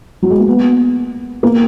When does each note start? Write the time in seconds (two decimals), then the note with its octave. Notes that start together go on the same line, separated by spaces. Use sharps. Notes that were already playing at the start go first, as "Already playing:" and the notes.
0.22 F#3
0.30 G#3
0.39 A#3
0.48 B3
1.43 A#3